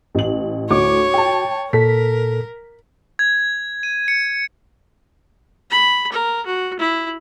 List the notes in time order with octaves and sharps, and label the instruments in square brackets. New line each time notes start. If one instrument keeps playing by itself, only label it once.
[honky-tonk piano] A1 F#7
[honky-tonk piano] D2 A2 D6 [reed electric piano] F#4 [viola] C#5
[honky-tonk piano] G5 A5
[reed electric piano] A#2 A4 [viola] A#4 [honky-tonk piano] B6
[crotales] G#6
D#7
C#7
[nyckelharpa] B5
A#4
F#4
E4